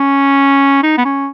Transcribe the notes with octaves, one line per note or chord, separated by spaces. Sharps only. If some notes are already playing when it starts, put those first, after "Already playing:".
Already playing: C#4
D#4
B3
C#4